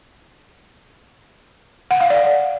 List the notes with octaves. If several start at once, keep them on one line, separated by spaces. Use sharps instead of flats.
F#5
F5
D5